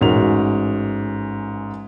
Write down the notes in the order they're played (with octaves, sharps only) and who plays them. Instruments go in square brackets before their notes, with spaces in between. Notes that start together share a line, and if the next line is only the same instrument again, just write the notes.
[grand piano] A1 G#2 F#4 A#4 F7